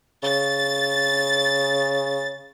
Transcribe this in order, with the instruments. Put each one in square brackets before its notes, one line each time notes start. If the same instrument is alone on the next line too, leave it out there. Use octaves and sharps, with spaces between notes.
[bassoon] C#3 [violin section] A6